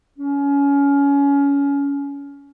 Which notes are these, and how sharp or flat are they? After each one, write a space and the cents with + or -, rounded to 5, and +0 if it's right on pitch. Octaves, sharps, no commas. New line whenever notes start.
C#4 +25